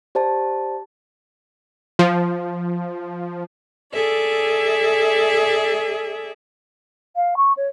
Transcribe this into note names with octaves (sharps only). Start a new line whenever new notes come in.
G4 C5 D5 A5
F3
G#4 A4 D5 E5
F5
C#6
C#5